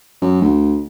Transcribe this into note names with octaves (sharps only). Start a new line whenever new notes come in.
F#2
D2